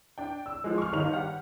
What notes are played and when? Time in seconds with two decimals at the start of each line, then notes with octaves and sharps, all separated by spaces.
0.18 D4 G5
0.46 E6
0.64 F3 G#3
0.78 C#6 F6
0.93 G1 D#3 G3 D#4 F7
1.13 G4 F#5